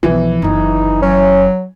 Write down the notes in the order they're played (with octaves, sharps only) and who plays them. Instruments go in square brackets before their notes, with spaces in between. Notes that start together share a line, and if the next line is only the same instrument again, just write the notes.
[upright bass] B1 F3 [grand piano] E3
[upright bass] F#1 D#3 [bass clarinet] D#4
[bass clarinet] F#3 [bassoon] C#4